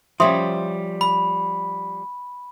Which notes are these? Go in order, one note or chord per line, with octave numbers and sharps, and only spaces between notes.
F3 G3 C#4 E5 C6 D#6
B5